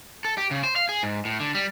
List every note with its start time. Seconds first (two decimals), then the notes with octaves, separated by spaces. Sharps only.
0.25 A4
0.38 G4
0.51 C#3
0.63 C5
0.76 F5
0.89 G#4
1.03 G#2
1.25 A2
1.40 D3
1.55 G3